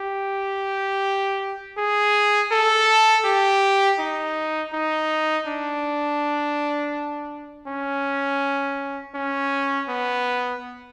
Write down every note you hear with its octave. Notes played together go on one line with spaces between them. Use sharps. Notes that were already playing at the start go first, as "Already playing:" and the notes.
Already playing: G4
G#4
A4
G4
D#4
D#4
D4
C#4
C#4
B3